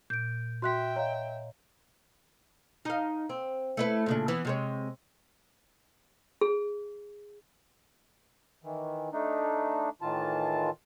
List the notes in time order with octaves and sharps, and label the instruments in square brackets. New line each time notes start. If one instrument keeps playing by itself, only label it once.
[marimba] A#2 [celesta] G6 D7
[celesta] F#4 F#6 B6 [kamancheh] E5 G5 [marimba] C6
[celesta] C#5 [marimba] D#5 F5 A#5
[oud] D#4 F5
C4
A3 E4 B4
A#2 C#3 D4
E3 B3
C3 G#3 C#5
[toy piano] G#4
[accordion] D#3 E3
A3 D4 D#4
A2 D#3 E3 F4 A5